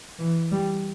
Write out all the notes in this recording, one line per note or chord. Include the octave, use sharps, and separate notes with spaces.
E3
G3